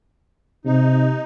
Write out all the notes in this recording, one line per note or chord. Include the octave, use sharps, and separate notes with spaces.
C3 D#4